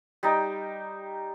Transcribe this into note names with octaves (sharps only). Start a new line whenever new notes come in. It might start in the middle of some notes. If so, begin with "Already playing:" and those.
G3 D#4 G5